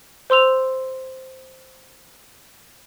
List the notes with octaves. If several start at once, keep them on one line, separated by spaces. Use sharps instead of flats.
C5 C6 E6 F7